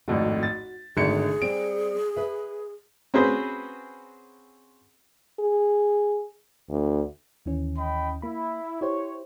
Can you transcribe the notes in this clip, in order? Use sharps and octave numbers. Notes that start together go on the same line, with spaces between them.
G#1 F2 A2 F#4
A6
G#1 D3 A3 G#4 C#7
G3 C4 D7
B4 E5
C4 C#4 F#4 G#4 B4 C5
G#4
D2
D#2 E3 C#4
D#5 G5 B5
A#3 E4 B5
E4 G4 C5 C#5